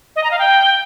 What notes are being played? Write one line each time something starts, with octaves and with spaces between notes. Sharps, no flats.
D#5
A#5
F5
G5